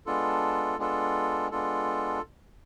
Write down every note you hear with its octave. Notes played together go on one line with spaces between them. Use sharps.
G#3 B3 D4 F4 A4
G#3 B3 D4 F4 A4
G#3 B3 D4 F4 A4